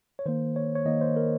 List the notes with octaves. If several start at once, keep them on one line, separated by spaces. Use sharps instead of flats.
C#5
D#3 A#3 C5
C#5
C#5
D#3 A#3 D#5
C5
A#4